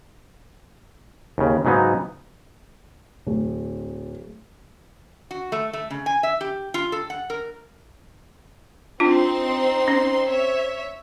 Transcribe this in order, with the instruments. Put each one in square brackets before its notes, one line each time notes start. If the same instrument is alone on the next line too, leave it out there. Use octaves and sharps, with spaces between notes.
[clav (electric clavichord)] D#2 C#3
G#2 C#3 F#3 B3 D#4
[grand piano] D1
[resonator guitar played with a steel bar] F#4
A3
A3
C#3
G#5
E5
G4
F4
A4
F#5
A#4
[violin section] C4 D#4 C6 [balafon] D4 F4
[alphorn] C5
[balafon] C#4
[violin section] C#5 E5